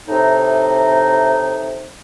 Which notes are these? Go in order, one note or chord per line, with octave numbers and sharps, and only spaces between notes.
A2 C3 D#4